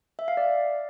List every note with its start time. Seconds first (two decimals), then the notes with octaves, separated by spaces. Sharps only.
0.19 E5
0.28 F5
0.37 D5